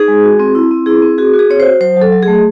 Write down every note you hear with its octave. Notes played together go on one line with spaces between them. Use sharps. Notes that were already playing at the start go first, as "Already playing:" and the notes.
Already playing: D#4 G#4
G#3
F#4
C4
E4
C4
E4 G#4
C4
F#4 G#4
F#4
G#4
C4 C#5
C5
F#4
F#3 C5
F#3 A4
F#3
G#4
A3